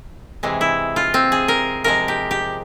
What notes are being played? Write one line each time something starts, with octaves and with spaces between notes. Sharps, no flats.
C3 E3 G#3
E4
F4
C4
G#4
A#4
C3 F3 G#3 A#4
G4
G4